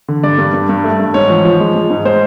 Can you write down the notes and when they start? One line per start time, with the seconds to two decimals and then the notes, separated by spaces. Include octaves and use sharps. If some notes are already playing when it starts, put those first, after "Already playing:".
0.08 D3
0.23 G2 D5
0.39 G2
0.54 G2
0.69 G2
0.84 A3
1.00 G2
1.14 G#2 C#5
1.30 F3
1.45 F3
1.60 G#3
1.75 G#3
1.90 G#2
2.05 G#3 C5